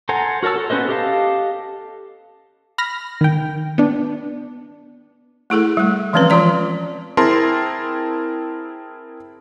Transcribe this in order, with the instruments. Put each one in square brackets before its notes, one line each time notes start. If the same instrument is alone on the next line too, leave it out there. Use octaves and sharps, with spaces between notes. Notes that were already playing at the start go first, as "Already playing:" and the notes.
[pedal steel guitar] A4 C5 F#5 G#5 A#5
F#4 A#4 C#5 A5 E6
A4
B3 C#4 B4 C5 D#5
G4 A4 D#5 F5 A5
[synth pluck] B5 F6 A#6
D#3 G5
B3 D4
[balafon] A3 E4 G#4 A4
G3 A3
E3 F3 G#3 C4 C#4 B4
E3 F3 F4 D5 A#5
[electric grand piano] C4 E4 G#4 A#4 A5 C6